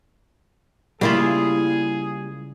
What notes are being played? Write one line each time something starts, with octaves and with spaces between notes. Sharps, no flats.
C#3 G3 A#3 E4 F4 G#4